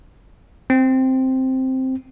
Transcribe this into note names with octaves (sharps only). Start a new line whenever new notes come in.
C4